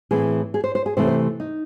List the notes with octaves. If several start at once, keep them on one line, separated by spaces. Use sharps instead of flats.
A2 E3 C4 G#4
G#4
C5
C5
G#4
C3 E3 A3 C4 C5
C5
D#4